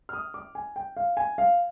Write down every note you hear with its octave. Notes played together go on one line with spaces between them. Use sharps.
F6
D#6
D6
G#5
G5
F5
G#5
F5